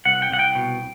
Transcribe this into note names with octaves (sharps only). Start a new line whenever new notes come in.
C2 F#5
G5
C2 F#5
G5
B2